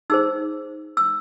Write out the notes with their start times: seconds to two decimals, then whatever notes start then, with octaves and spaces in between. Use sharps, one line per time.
0.10 D#4 G#4 C5 E6
0.97 E6